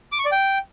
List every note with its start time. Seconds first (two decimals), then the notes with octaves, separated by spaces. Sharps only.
0.12 D6
0.19 C#6
0.25 D5
0.32 G5